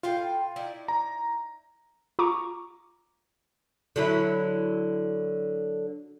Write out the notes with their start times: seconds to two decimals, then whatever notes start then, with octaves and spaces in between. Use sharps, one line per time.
0.03 A2 F4 F5 G5
0.56 D#4 E4 D5
0.88 A#5
2.19 F4 A#5 C#6 D6
3.96 D3 F#3 E4